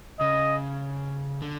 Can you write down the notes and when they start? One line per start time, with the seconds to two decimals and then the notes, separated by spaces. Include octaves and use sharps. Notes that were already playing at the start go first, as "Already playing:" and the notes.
0.20 C#3 D#5
1.42 D3